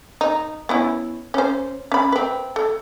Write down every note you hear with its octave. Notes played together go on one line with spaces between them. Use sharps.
D#4
B3 C#4 E4
C#4 C5
C#4 B5
C4 B4
A4